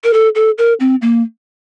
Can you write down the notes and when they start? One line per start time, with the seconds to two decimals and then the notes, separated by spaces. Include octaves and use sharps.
0.04 A#4
0.13 A4
0.35 A4
0.58 A#4
0.80 C4
1.02 A#3